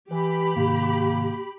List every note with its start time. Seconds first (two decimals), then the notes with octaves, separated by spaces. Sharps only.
0.11 E3 G4 B4 B5
0.56 G#2 C3 D#3 A#3